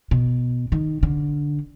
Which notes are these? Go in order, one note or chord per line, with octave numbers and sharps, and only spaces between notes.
B2
D#3
D3